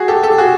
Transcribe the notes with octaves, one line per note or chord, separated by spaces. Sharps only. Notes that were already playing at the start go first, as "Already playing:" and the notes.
Already playing: F#4 G#4
G4 A4
G4 A4
F#4 G#4